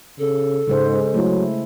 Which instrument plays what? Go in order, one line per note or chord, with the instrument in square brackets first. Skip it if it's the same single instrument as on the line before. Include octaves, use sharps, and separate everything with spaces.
[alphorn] C#3 [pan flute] A4
[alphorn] G#2 [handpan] C#3 G#3 C5
[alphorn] F#3 [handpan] A3 E4